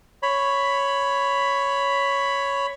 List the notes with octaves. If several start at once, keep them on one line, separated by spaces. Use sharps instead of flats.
C#5 B5